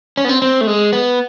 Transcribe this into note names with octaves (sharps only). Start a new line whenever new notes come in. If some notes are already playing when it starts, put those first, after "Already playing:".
C#4
B3
C4
C4
A3
G#3
B3